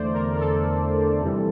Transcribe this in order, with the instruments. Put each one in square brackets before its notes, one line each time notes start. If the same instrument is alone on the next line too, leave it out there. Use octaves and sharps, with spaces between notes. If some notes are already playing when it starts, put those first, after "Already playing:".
Already playing: [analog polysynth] E2 D3 A3 C5 D5
A#4
A#4
A4
F2 C3 E3 G3 C4